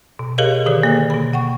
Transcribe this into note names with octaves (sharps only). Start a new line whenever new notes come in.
B2
G4 G#4 A#4 C#5 D#5 F5
D3 D#3 G#4 A4 D5
A#3 G#4
B2 B5
F#5 G5 C#6